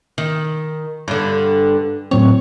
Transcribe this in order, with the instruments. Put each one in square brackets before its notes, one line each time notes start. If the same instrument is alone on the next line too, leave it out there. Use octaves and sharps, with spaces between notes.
[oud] D#3
G2 D3
[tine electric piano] A2 F#3 C4 [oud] C#5